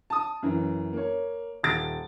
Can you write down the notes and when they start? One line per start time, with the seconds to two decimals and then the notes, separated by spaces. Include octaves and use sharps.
0.10 A5 D#6
0.42 F#2 E3
0.93 A#3 C#5
1.63 D#1 A6 D7